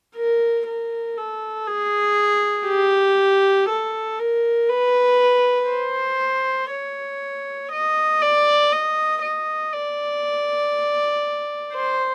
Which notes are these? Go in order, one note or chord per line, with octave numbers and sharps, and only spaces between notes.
A#4
A#4
A4
G#4
G4
A4
A#4
B4
C5
C#5
D#5
D5
D#5
D#5
D5
C5